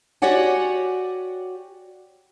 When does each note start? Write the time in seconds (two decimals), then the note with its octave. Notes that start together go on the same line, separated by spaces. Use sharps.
0.22 F#4 G4 C#5 D5 F#5 G#5